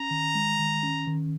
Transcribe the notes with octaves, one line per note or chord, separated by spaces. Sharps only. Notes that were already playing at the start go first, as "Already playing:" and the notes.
Already playing: C#4 A#5
D#3
G#3
D#3
C#4
D#3